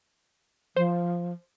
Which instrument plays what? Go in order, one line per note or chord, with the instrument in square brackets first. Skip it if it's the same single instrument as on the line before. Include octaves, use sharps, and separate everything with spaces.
[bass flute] F3 [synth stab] C5